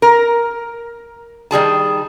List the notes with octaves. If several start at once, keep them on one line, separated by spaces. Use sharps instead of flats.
A#4
D#3 G3 G#4 A5